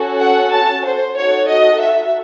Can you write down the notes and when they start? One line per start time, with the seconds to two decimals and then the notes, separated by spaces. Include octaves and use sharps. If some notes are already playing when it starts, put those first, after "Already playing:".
Already playing: C#4 F#4 A4
0.21 F#5
0.52 A5
0.85 C5
1.16 D#4 F#4 A4 C#5
1.48 D#5
1.80 E5